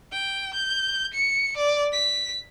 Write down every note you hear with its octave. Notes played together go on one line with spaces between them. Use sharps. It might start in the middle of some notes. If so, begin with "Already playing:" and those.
G5
G6
C#7
D5
B6